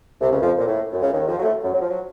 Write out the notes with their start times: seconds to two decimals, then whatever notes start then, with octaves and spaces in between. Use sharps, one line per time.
0.21 C2 C3
0.31 C#2 C#3
0.41 F2 F3
0.58 A#2
0.67 A2
0.93 F#2
1.02 C#2 C#3
1.12 D#2 D#3
1.28 F2 F3
1.39 F#3
1.43 A2 A3
1.63 F#2 F#3
1.74 F#3
1.81 F3
1.88 F#3